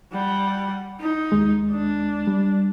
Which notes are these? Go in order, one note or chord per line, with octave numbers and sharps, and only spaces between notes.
G3 F#5
D#4
D#2 G#3
D4
G3